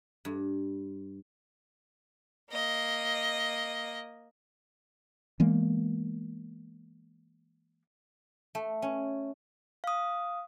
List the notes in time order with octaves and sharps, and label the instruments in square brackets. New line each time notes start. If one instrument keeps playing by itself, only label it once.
[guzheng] G2
[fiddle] A#3 D#5
[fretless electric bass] E3 G#3 A#3 B3
[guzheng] A3
C#4
[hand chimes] F5 D#6